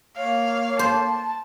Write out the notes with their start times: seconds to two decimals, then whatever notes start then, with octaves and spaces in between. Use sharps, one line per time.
0.17 A#3 C#5 F5
0.79 C5 A5